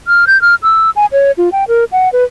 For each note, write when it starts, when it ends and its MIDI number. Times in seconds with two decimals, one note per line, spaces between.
0.08 0.25 89
0.27 0.40 91
0.42 0.55 89
0.63 0.90 88
0.96 1.06 80
1.12 1.31 73
1.38 1.50 65
1.52 1.64 79
1.68 1.85 70
1.92 2.11 78
2.13 2.24 71